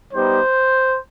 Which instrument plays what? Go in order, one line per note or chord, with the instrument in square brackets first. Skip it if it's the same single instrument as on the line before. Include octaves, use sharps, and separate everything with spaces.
[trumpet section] G3 B3 D#4 G4 C5